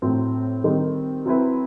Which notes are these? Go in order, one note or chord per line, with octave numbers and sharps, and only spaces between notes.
A2 F#3 C4
D#3 G3 C4 D#4
F#3 C4 E4 B4